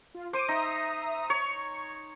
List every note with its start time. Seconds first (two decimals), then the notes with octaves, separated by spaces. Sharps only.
0.15 F4
0.33 C5 D6 D7 D#7
0.48 D#4 E5 A#5 D#6
1.30 C#5 C#6